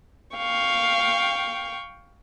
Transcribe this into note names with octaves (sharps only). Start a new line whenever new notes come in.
F5 G5 C#6